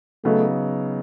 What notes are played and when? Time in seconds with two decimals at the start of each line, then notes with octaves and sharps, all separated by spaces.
0.24 C#3 F#3 A3 B3 D#4